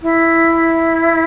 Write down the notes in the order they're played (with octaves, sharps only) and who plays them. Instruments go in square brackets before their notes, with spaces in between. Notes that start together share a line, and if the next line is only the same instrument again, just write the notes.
[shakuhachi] E4